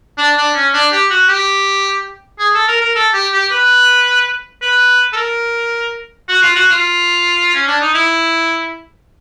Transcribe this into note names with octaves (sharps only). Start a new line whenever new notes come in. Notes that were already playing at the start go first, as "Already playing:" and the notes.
D4
D4
C#4
D4
G4
F#4
G4
G#4
A4
A#4
A#4
A4
G4
G4
B4
B4
A4
A#4
F#4
F4
F#4
F4
C#4
D4
D#4
E4